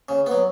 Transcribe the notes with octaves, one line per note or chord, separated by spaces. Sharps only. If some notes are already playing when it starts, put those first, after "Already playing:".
C#3
B3
F#3